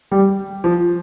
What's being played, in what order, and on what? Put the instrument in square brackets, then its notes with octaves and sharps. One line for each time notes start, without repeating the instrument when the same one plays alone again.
[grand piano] G3
F3